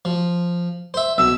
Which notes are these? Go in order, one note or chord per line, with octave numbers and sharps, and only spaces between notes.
F3
C5 E5
B1 E6